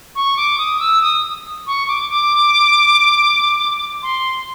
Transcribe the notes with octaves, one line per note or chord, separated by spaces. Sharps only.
C#6
D6
D#6
E6
D#6
C#6
D6
D6
C6